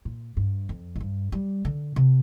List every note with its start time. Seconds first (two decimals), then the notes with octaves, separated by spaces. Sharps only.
0.05 A#2
0.37 G2
0.69 F2
0.96 A#2
1.01 G2
1.32 G3
1.65 D3
1.96 C3